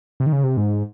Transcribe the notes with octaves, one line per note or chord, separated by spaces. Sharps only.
C3
D#3
C#3
C3
G#2